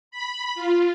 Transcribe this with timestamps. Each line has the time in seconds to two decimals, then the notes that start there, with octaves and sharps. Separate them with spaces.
0.11 B5
0.55 F4